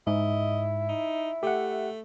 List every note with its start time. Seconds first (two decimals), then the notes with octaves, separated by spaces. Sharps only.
0.07 G#2 E4 D#5
0.88 D#4
1.43 A3 G4 F#5